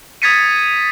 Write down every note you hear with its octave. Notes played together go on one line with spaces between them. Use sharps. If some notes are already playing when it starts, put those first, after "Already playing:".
D#6 G#6 A6 B6 C#7 D#7